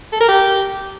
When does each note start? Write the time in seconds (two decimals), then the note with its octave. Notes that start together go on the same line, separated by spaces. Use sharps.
0.13 A4
0.20 A#4
0.28 G4